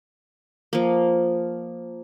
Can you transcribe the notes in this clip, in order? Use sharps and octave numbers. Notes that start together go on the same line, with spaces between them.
F3 A#3